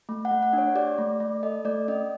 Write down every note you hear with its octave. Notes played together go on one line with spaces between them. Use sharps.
A3
F#5
A3
F#5
D4
C#5
G4 D5
A3
A3
A4 D#5
A3 D5
C#4 D#5